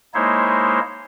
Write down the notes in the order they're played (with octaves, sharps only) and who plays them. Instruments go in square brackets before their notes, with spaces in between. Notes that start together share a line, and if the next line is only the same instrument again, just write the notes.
[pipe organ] G#3 A#3 D#4 E4 C5 C#5